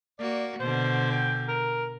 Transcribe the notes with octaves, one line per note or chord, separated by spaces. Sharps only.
A#3 F#4 D5
B2 D3 C5
G5
A#4